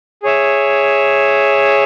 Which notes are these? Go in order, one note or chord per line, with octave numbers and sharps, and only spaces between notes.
G#4 C#5 E5